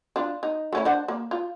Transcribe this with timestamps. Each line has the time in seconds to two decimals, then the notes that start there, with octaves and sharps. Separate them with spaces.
0.16 D4 F4
0.43 D#4
0.73 A3 C#4 E4
0.85 D4 C5 F#5
1.08 A#3
1.31 F4